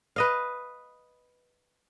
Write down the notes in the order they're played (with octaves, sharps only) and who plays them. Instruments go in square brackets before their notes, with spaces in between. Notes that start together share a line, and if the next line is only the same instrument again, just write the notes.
[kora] B4 D#5 F5